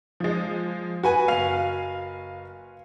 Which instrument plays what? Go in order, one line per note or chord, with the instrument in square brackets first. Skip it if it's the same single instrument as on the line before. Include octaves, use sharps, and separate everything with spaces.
[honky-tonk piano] F3 G#3
[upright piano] F#4 B4 G#5
[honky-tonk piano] F#1 F5 F7